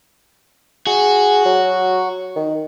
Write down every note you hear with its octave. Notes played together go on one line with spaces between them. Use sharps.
F#4 G#4
F#3
D#3